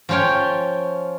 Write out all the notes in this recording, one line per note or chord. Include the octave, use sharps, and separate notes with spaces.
F3 C#4 F4 C#5 G5